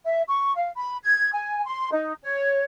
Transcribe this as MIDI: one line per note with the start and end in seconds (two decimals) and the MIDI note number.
0.05 0.22 76
0.28 0.53 85
0.56 0.70 77
0.76 0.97 83
1.03 1.30 92
1.32 1.64 80
1.66 1.90 84
1.91 2.13 63
2.23 2.63 73